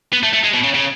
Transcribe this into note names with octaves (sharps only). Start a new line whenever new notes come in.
B3
A3
A3
G#3
B2
C#3
C#3